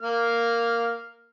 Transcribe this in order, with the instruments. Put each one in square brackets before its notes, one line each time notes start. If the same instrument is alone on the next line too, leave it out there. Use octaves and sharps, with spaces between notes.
[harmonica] A#3 F6